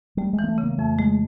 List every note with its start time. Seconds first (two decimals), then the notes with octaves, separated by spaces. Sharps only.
0.17 G3 A3
0.33 G#3
0.39 E3
0.44 A#3
0.48 A3
0.58 C#3
0.63 A#3
0.78 F2 A3
0.98 G#3 A3